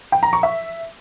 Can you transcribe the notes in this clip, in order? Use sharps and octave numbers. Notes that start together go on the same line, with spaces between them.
G5
A#5
C#6
E5